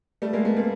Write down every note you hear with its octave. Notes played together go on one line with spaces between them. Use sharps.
G3 A3
G#3 A#3
A3 B3
A#3 C4